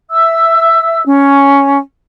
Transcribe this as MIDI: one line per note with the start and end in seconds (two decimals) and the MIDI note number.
0.10 1.02 76
0.10 1.02 88
1.05 1.78 61